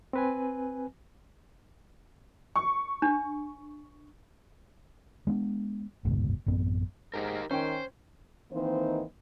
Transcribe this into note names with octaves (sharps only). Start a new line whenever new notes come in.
C4 B4 G#5
C#6
D4
G#3 B3 D4
F#1 D2 G#2 B2
A1 F#2 B3 C4
G#2 D#4 G4 A#4
D#3 C#4 C5 G5
D#3 E3 A#3 C4 D#4 C5